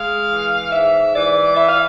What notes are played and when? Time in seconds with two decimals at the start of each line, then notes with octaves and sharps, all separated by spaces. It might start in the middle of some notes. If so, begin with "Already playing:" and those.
Already playing: G#3 F5
0.30 E3
0.72 G#2 E5
1.15 E3 D5
1.57 E4 E5
1.69 F5